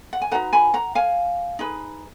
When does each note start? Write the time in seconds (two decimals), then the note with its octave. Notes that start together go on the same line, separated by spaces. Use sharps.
0.13 F#5
0.22 G#5
0.31 D#4 F#4 B4 F#5 A#5
0.53 G#5 B5
0.74 F#5 A#5
0.95 F5 G#5
1.59 D#4 G#4 B4